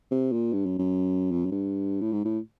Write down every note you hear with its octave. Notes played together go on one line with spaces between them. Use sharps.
C3
A#2
G2
F#2
F#2
F2
F#2
G2
A2
G#2
A2